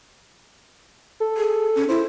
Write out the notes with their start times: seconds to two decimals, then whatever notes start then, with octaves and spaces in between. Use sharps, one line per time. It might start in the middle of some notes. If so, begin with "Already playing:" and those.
1.20 A4
1.37 G#4
1.75 C#4
1.89 E4 C5